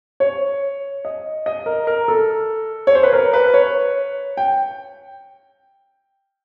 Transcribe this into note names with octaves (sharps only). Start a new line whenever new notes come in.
C#5
D#5
D#5
A#4
A#4
A4
C#5
C5
B4
A#4
B4
C#5
G5